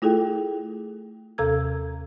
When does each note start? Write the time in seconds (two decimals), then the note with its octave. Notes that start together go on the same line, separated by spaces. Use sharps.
0.02 A3 E4 F4 G#4 A4 G5
1.38 D#2 C3 A4 A#5 E6 G#6